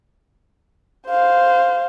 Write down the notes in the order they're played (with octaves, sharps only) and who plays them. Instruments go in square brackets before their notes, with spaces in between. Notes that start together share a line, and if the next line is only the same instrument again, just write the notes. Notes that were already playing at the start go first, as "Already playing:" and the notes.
[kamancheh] C5 F5